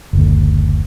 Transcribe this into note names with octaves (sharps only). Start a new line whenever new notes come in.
F#1 D2